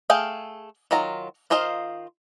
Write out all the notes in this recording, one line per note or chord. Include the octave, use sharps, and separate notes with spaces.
A3 G#4 F5 G5
D#3 F#3 F4 A#5
D#3 F4 C5 D#5 F5